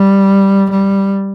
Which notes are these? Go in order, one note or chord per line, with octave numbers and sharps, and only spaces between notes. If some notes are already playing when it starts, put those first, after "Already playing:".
Already playing: G3
G3